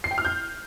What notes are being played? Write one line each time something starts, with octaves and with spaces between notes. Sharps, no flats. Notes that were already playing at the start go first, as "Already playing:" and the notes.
C7
G5
F6
G6